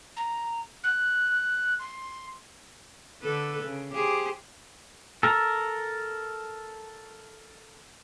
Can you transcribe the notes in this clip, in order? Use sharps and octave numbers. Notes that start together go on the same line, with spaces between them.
A#5
F#6
C6
D3 A4 B4
C#3
G4 G#4 C5
A4 A#4